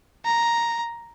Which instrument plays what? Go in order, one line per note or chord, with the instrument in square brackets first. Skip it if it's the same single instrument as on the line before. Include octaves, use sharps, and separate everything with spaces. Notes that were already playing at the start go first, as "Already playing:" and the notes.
[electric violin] A#5